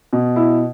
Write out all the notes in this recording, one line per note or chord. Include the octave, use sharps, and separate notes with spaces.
B2
E4